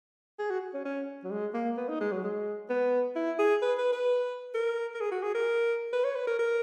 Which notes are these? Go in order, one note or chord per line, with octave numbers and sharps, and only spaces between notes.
G#4
F#4
C#4
C#4
F#3
G#3
A#3
B3
D#4
G#3
F#3
G#3
B3
E4
G#4
B4
B4
B4
A#4
A#4
G#4
F#4
G#4
A#4
B4
C#5
B4
A#4
A#4